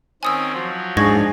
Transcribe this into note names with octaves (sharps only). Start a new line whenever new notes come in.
D#3 C4 C#4 G#5 D#6 E6
F3 F#3 F4
G#2 D4 G#4 C#6 G#6 A#6